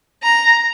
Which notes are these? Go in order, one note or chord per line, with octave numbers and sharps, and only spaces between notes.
A#5